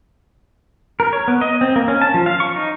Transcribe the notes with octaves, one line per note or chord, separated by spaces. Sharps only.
A#4
C#5
B3
D#5
C4
A#3
C#4
A5
F3
F5
C#6
D#4